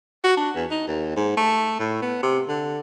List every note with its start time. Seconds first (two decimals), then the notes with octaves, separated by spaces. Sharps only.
0.24 F#4
0.37 D4
0.55 E2
0.71 D#4
0.87 D#2
1.16 G#2
1.37 A3
1.80 A2
2.02 B3
2.23 C3
2.48 D3